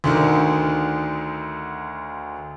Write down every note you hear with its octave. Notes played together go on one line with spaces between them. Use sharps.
D2 D3 D#3